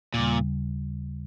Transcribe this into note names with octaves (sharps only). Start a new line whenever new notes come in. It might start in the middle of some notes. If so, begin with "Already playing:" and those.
D#2 A#2 C#3 G3